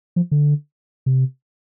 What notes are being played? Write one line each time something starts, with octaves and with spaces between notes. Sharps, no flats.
F3
D3
C3